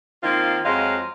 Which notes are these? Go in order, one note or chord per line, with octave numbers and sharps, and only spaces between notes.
D#3 F3 A#3 C4 D#4 F4
F2 F#3 G#3 C5 D#5 F5